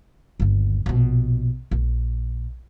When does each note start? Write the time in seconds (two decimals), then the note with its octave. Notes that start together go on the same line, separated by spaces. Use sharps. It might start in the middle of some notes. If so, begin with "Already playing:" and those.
0.40 G1 D#2
0.86 A#1 B2
1.71 A#1